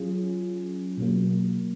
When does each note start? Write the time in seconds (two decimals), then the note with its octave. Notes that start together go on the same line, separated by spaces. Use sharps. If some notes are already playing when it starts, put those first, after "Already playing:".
Already playing: F#3 C#4 F4 G#4
0.98 B2 F#3 A#3